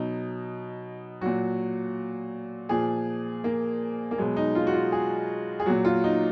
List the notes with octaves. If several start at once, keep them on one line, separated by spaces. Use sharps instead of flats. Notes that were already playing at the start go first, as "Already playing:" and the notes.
Already playing: B2 F#3 D#4
A#2 F#3 F#4
A#2 F3 G#4
A#3
A#3
B2 F#3 G#3
D#4
F4
F#4
F4
G#4
G#4
A#2 F#3 F#4
F4
D#4